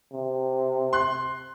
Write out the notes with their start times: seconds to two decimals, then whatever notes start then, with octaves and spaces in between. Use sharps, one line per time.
0.12 C3
0.93 C6 F#6